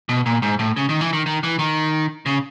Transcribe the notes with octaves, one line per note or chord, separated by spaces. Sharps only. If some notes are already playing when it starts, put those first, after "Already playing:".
B2
A#2
G#2
A2
C#3
D#3
E3
D#3
D#3
E3
D#3
C#3